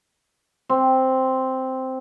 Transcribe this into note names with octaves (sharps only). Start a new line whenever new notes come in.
C4